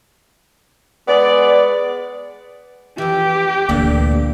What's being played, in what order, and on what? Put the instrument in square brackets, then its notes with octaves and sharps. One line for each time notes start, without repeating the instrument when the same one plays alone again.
[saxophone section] G#3 B3 G#4 D5
[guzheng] F2 E3 [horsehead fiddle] G4
[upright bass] D2 [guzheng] A#2 D3 E3 [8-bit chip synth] A#3